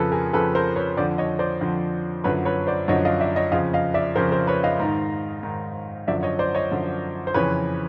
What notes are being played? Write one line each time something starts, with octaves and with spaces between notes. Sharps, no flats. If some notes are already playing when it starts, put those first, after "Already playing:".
Already playing: F2 C#3 F3 A4 B4
G#4 A#4
F2 C#3 F3 A4 B4
A#4 C5
B4 C#5
F2 D3 F3 C5 D5
C#5 D#5
C5 D5
F2 D3 F3
F#2 D3 F3 B4 C#5
B4 C#5
C5 D5
F#2 D3 F3 C#5 D#5
D#5 F5
D5 E5
C#5 D#5
F2 C#3 F3 D#5 F5
D#5 F5
D5 E5
F2 C#3 F3 A#4 C5
A#4 C5
B4 C#5
D#5 F5
G#2 D#3
G#2 D#3
F#2 D3 F3 D5 E5
C#5 D#5
C5 D5
C#5 D#5
F#2 D3 F3
C5
F2 C#3 E3 B4 C#5